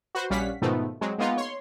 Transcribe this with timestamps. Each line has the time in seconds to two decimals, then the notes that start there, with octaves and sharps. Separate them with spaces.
0.15 F#4 B4 C5
0.30 A#1 G3 C#4 F5 F#5 B6
0.62 G#2 B2 D#3 F3 A3 B3
1.01 F#3 G#3 C4
1.18 G#3 A#3 B3 D#4 F4
1.37 C#5 C6